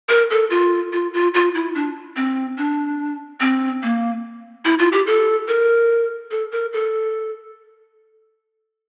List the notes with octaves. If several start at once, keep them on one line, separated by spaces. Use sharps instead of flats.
A#4
A4
F4
F4
F4
F4
E4
D4
C4
D4
C4
A#3
E4
F4
G4
A4
A#4
A4
A#4
A4